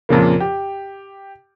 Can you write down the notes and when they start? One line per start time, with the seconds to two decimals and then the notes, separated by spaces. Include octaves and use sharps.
0.09 F2 A#2 C#3 A#3
0.40 G4